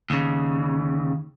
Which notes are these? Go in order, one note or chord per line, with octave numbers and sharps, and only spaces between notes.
D#2 C#3